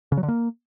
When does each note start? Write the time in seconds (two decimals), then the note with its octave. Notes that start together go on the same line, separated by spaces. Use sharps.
0.12 C#3
0.17 F#3
0.23 D3
0.28 A#3